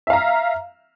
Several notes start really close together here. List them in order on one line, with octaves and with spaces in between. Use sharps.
E5 F5 A#5